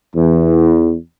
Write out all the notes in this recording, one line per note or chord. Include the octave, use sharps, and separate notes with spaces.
E2